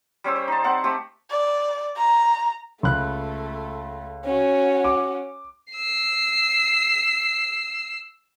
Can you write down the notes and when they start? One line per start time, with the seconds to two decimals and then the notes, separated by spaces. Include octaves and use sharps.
0.24 G3 C#4 C5 E6
0.36 C5
0.48 D#4 A5
0.64 C4 F#5 A5
0.84 A3 C4 G4
1.31 D5
1.97 A#5
2.83 C#2 A3 B5 F#6
4.25 C#4 F#4
4.84 D6
5.73 E6 C7